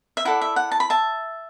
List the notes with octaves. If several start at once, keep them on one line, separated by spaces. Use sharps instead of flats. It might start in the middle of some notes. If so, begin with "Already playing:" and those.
E5
E4 A4 D5 F#5
E5
F#5
A5
B5
E5 A5